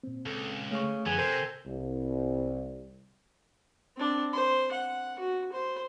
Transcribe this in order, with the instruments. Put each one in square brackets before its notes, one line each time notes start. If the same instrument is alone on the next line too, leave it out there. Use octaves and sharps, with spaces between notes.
[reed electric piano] A#2 C4
[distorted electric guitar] C#2 [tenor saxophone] A4
[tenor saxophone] C#3 [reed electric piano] A3 C#6
[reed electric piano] F#2 F3 G#4 [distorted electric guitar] D3 [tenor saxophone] B3 [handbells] G#5 G#6
[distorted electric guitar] C3 [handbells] A4 [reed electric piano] A#4 [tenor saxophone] C5
[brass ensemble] C2
[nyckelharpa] C4 D4
C5
F#5
F#4
C5